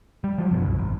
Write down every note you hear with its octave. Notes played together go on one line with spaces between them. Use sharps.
G3
F3 F#3
F#1 B2 E3
F#1 C2
G#1